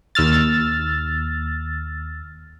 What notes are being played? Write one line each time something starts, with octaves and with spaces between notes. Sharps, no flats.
D#2 E6 F6 A6